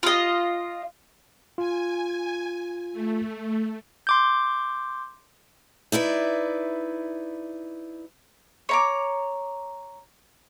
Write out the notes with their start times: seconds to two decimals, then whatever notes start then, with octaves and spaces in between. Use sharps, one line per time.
0.03 F4 D#5
1.58 F4 G#5
2.93 A3
4.07 C6 D6 G6
5.92 D#4 E4 B4 D5
8.69 C#5 A#5 D6